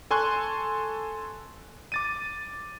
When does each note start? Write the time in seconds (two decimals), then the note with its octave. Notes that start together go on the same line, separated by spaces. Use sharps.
0.11 A4 G#5 C6 C#6 F#6
1.92 D6 A6 D#7